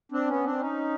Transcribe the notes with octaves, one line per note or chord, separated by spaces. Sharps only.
C4 D4
B3 C#4
C4 D4
C#4 D#4